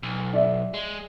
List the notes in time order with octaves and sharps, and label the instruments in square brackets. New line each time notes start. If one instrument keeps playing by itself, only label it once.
[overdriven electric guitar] B1
[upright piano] D5 E5
[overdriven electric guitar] G#3